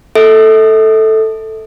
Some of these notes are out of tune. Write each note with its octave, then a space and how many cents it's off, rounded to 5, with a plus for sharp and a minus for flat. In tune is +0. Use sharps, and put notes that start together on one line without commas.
A4 +0 E5 -40